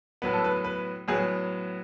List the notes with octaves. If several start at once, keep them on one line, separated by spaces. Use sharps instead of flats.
A2 F#3 B3 B4
A4
B4
B4
A2 F#3 B3 G#4